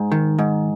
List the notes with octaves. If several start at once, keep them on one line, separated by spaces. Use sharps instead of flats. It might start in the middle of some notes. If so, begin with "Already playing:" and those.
Already playing: G#2
D#3
G#2